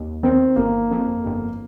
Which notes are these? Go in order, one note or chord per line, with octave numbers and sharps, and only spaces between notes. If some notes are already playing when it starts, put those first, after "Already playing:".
Already playing: D#2
D#3 C4
G1 A#3
F2
G1